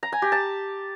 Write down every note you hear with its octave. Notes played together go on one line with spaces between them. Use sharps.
A#5
G#5
G4
A5